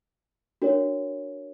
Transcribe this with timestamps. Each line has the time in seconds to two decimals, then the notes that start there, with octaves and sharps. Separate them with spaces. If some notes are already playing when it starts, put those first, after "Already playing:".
0.62 D4 F#4 A#4 C#5